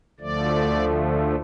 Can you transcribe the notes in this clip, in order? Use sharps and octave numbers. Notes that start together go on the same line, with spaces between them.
D2 D3 F3 A3 D5